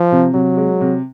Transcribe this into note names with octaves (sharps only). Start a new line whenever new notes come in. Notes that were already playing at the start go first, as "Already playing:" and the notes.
Already playing: F3
C3
C3 F#3
G#3
C3